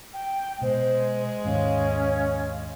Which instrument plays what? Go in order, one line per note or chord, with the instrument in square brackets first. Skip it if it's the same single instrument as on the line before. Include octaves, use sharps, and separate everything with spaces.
[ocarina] G5
[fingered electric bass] B2 [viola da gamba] G#3 [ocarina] C5
[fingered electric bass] D#2 G#2 [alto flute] C#4 [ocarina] F5